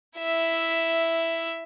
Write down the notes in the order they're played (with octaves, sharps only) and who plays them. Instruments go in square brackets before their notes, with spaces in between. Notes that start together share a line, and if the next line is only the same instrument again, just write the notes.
[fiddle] E4 E5